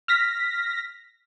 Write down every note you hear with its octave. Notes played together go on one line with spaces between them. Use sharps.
F6 A#6 B6